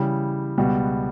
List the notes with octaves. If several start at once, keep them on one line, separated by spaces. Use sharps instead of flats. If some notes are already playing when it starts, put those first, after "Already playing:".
Already playing: C#3 E3 G3
C#2 B2 G3 B3 F#4